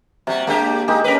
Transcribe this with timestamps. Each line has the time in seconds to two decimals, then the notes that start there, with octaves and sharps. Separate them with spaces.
0.27 C3 G3 F#4
0.47 G#3 A#3 D4 G4
0.88 G#3 A#3 D#4 G4
1.04 C#4 A#4 B4